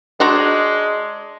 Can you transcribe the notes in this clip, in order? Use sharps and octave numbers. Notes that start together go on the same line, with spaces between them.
G#3 D4 F#4 C5 A#5